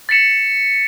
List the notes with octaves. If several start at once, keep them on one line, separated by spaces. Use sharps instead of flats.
A6 B6 C#7 E7